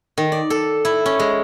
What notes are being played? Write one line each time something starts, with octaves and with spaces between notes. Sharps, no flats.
D#3
D5
A4
E4
C#4
G#3